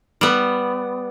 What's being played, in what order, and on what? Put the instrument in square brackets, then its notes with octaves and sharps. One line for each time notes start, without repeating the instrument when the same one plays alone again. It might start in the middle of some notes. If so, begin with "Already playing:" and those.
[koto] G3 B3